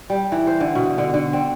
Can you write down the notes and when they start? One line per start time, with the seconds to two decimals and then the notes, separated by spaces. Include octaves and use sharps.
0.10 G3
0.32 E3
0.47 C5
0.60 D3
0.75 B2
0.98 D3
1.14 D3
1.33 C4